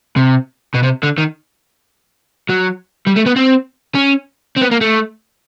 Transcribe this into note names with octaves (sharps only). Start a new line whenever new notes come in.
C3
B2
C3
D3
D#3
F#3
G3
A3
B3
C4
C#4
C4
B3
A#3
A3